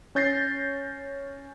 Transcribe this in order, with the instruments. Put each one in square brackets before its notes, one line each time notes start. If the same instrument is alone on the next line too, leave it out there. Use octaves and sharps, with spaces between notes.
[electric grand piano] C#4 C#5 G6 A6 A#6 C7